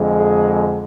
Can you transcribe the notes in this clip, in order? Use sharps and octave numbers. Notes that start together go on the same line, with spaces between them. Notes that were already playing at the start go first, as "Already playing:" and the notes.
Already playing: F2 D3 G#3
G#4